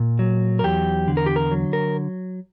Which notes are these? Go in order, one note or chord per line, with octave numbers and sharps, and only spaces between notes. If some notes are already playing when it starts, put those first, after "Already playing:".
Already playing: A#2
F#3
A#4
E2 G4
D3
A#4
G4
A#4
F#3
A#4